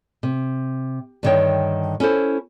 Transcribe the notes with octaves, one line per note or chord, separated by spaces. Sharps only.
C3
G2 D3 D#3 A#4 C#5 G5
C#4 E4 A4 C5